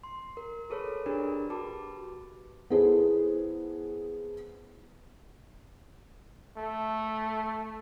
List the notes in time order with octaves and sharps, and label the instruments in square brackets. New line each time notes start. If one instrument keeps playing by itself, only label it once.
[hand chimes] C6
A#4
G#4 A4 B4 C#5
D4 G4 G#4 A#4 B4
F#4 G4 B4 A5 D6
[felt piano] B3 E4 G#4 A4 C5
[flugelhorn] A3